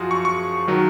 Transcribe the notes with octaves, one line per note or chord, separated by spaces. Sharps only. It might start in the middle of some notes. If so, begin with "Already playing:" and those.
Already playing: F#2 F3 F4 F#4 G#4
C#6
C#6
D#3 F#3